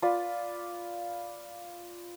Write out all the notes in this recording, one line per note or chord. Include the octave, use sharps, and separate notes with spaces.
F4 B4 D5